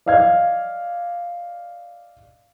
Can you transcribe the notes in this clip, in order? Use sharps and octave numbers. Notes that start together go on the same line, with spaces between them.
D5 D#5 F5 F6 G#6